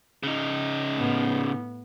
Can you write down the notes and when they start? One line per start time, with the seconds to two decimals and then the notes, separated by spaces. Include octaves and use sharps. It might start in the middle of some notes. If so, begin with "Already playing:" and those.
0.23 C#3 D#4
0.97 A2 B3